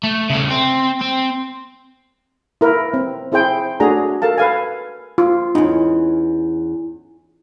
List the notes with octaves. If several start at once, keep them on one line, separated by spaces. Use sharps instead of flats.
A3
C#3 A3
C4
C4
E4 A#4 B4
C4
C4 E4 G#4 C5 G5
A3 D4 F#4 G#4 A#5
A4 A#4 F5 A5
B4 F5 G#5
F4
E2 C#4 D#4